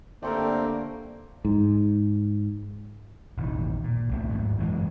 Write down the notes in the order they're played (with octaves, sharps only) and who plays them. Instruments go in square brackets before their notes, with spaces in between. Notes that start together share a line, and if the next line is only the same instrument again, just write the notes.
[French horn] D3 [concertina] A3 C4 G4 [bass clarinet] A#3 [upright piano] D4 A4 A#4
[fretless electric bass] G#2
[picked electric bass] E1 A1 D#3
A#2
C2 C3 A3
D#2 G#2
F#2 E3 G3 G#3